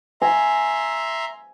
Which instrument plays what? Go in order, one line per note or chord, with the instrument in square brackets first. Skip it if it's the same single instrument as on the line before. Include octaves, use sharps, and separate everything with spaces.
[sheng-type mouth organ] E5 A#5 C6 [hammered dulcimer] G#5